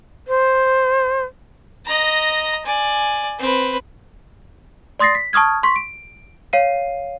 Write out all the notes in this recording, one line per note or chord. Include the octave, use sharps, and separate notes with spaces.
C5
D#5 A#5
D5 G#5
C4 B4
D5 C6 D#6 A6 A#6 C7
B6
A5 C#6 D#6 F6 G#6
C6 C#6 B6
D7
C#5 F5 C7 D#7